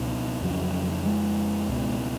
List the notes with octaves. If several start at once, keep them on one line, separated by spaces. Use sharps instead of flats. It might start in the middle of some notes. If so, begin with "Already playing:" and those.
Already playing: C#2 B2
F2 C#3 F#3
G#3
C#2 B2